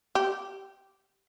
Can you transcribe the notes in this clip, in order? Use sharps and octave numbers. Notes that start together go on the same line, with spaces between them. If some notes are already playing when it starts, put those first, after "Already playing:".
G4